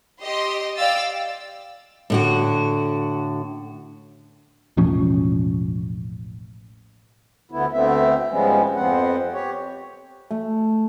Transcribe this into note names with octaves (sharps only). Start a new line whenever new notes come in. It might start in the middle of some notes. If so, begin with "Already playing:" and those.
G4 D#5 C6
D5 F5 G5 E6 A6
A2 D3 F#4
E1 A1 F3 C#4
D2 D3 B3 E4
D2 D3 A3 B3 C4 E5
G#2 F3 G3 G#3 B3 C#4
F2 F3 B3 C4 F#5
G4 C#5
A3